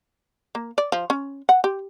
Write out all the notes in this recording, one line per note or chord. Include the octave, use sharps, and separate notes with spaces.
A#3
D5
F3
C#4
F#5
G4